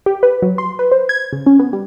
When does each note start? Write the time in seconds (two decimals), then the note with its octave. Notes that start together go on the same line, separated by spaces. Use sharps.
0.06 G4
0.23 B4
0.42 F#3
0.58 C6
0.79 B4
0.92 C5
1.09 G#6
1.33 C#3
1.46 C#4
1.59 B3
1.73 G3